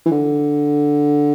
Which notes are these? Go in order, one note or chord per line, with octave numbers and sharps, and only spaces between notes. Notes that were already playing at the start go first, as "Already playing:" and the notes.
E3
D3